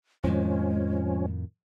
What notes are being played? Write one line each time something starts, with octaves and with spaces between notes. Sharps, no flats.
F2 A2 D#3 F3 G#3 C#4